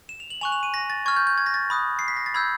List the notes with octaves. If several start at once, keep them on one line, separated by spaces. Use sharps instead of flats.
E7
F7
F#7
G#5 C#6 F#6 F7
F7
D#7
A#6
A6
C#6 F6 G#6
G6
G6
G#6
A#6
A6
B5 D#6 F#6
C7
B6
A#6
A6
B5 E6 G6 G#6